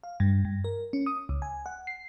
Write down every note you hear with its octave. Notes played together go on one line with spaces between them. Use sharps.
F5
G2
G2
A#4
C#4
D#6
C#2
G#5
F#5
C7